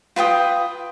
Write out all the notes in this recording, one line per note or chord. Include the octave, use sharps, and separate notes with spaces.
F4 B4 G5 D#6